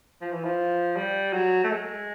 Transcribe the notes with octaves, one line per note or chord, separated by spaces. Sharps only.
F3
E3
F3
G3
F#3
A3
G#3